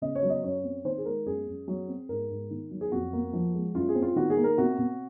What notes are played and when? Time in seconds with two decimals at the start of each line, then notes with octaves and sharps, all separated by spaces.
0.02 C#3 D#5
0.15 C#5
0.23 F#3
0.30 D#5
0.43 F#2 C#5
0.64 C4
0.84 D#3 C5
0.98 G#4
1.05 G#3 A#4
1.26 F#2 G#4
1.47 F#2
1.68 F#3
1.88 C4
2.09 G#2 A#4
2.30 G#2
2.51 D#3
2.71 F#3
2.81 G#4
2.92 F2 F#4
3.13 A#3
3.33 F3
3.54 G#3
3.75 F#2 F4
3.89 G#4
3.95 C4
4.02 F4
4.16 D#3 F#4
4.30 G#4
4.37 A#3
4.44 A#4
4.58 C3 F#4
4.79 C3